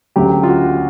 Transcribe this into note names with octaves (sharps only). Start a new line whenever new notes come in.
D2 C#3 F#3 G4
F4
F#4